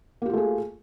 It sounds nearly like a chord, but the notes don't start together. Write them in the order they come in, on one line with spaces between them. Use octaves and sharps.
A#3 G4 F4 A3 G#4